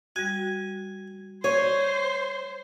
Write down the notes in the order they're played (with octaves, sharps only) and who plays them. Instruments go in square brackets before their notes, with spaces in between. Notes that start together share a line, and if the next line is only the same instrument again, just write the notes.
[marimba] G3 F#4 [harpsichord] G#5
[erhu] C5 [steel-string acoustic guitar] C#5 [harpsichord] G#5